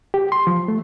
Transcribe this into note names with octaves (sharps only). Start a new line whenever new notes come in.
G4
C6
F3
A3